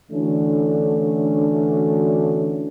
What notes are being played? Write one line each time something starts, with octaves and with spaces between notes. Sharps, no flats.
D3 E3 A3 C#4 D4 F#4